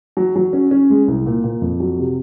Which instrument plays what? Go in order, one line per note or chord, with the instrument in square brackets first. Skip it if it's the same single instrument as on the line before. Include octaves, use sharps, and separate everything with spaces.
[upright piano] F#3
F#3
C#4
C#4
G#3
C2
A#2
A#2
F2
F#3
C3